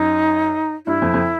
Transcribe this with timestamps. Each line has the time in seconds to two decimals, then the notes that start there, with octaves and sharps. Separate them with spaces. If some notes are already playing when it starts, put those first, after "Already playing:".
Already playing: F#2 D#4
0.86 G2 E4
1.02 F2
1.14 F2